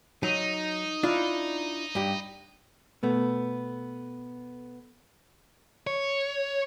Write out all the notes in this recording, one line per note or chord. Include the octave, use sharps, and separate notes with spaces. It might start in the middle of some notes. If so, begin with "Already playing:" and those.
F#3 D#4
D4 E4 F4
G2 G4
B2 A3 B3
C#5